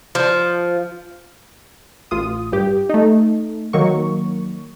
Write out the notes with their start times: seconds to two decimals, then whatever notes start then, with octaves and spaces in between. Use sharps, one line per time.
0.15 F3
2.11 A1 F4 D#6
2.52 G2 G4
2.90 A3 D#4
3.73 D#3 F#3 A#3 C#6